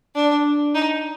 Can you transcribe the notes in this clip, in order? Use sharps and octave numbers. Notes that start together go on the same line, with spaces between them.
D4
D#4